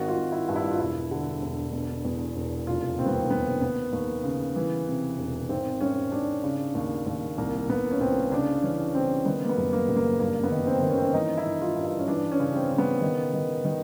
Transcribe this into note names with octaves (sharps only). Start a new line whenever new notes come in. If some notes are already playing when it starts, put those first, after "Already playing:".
Already playing: G#1 D#3 F#4
F4
G#1
E4
G2
E4
F4
E1 E4
D3
E1
B2
E2
E1
F1 F4
D#2 C4
B3
C4
F1 B3
D#2 B3
D#2
C#3
E3
C3
E1
G#1 C4
G#1 C#4
G#1 D4
C#3
D#2
D#2
C2 A#3
C2 B3
C#4
C2 C4
C#3 D4
E3 C#4
C#3 C4
D#3 B3
A#3
B3
F#2
A#3
F#1
A#3
G2 A#3
B3
D#3
C4
D#3
C#4
C4
C#4
E3 D#4
E4
G1
F4
G2
E4
C#4
E3 D4
C#4
C#3
C4
C#3
B3
D#3
D#3
D#3